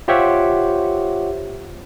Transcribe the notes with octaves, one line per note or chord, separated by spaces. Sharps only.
F4 G4 C5 C#5 E5 F#5